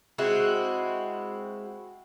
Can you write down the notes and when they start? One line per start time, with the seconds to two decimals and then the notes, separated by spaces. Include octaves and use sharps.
0.18 G#3 C4 E4 F#4